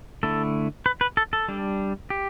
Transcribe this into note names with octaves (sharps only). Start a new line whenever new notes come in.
D3 A3 E4 A4
B4
B4
A4
A4
G3 D4
G4